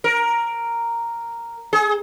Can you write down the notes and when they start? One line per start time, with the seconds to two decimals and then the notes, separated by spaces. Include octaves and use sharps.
0.04 A#4
1.73 G#4